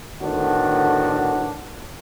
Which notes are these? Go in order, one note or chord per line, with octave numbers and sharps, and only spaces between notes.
A2 D3 D#3 B3 D4 F#4